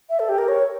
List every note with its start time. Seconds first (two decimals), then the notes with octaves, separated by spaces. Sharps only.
0.10 E5
0.20 A4
0.29 G4
0.38 A#4
0.48 C#5